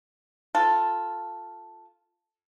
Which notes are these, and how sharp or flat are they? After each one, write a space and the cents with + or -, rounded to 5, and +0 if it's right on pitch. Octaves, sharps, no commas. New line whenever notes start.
F4 +0 A4 +0